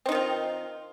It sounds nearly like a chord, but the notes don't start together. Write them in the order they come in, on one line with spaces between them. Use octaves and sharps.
C4 D#4 D#3 F4